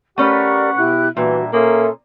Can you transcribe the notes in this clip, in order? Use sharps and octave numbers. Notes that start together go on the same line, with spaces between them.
A3 C#4 G4 A#4 B4 D5 F#5 C#6
B2 E4 G4 F#6
A#2 E3 G3 D4 F#4 E5
A#3 C#4 A4 E5 C6 D#6